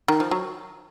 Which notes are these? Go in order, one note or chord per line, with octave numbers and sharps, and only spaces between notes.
D#3
F3
F#3